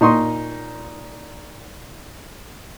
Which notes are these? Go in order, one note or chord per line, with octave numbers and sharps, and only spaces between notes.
A#2 D#4 C6 C#6 D#6